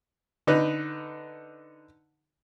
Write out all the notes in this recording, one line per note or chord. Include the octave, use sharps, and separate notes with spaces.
D3 D#4 B4